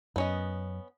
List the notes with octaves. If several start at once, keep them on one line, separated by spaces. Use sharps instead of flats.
F#2 B3 C#4 D#5